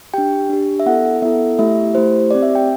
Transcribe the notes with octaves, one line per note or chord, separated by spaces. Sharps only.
D4 G4 G5
D4 G4
E5
B3 E4 A4 F#5
B3 E4 A4 E5
A3 E4 G4 E5
A3 E4 G4 C5
C4 G4 D5
E5
G5